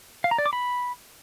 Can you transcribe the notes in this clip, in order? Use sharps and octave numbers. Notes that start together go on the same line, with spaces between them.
F5
A#5
D5
D6
B5